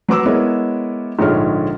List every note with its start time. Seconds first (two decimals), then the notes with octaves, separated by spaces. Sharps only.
0.08 F#3 B4 D6 E6
0.25 G#3 B3 E4 A#4 C#5
1.19 A#1 G#2 D3 G#4 C#5 F6